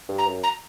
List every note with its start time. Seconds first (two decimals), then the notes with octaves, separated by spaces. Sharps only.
0.09 G2
0.18 A#5
0.27 F#2
0.43 A#5